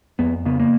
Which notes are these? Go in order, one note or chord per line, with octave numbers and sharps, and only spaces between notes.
F2 B3
C#3 B3
A#3